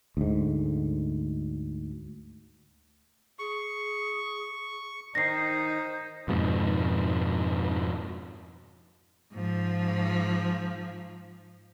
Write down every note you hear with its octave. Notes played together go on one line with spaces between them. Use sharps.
D2 G#2
G#4 C#6
D#3 D#4 C5 A#6 C7
F2 G#2 B2
G#2 F3